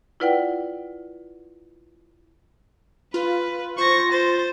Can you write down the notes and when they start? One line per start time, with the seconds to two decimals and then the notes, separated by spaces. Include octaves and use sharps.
0.20 E4 F4 B4 D5 F#5 G5
3.14 F4 B4
3.78 F4 C5 C#6 A#6
4.12 C5 A6